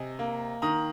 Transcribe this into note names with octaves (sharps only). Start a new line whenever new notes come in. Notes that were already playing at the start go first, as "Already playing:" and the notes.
Already playing: C3 D#5 G#5
A#3
D#3 A#5 D#6